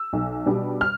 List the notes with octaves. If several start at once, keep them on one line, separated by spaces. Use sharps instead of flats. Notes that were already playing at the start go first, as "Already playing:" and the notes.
Already playing: E6
B1
B2 G3 D4
F6